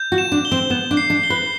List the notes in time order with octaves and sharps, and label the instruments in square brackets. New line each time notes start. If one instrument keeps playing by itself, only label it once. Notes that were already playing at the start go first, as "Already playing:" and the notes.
Already playing: [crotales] G6
[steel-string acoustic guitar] F#4
[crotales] E7
[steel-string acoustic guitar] D4
[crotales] G7
[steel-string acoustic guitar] C4
[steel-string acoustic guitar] B3 [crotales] E7
[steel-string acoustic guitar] D4
[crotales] C7
[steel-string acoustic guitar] D4
[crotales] G7
[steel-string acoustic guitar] B4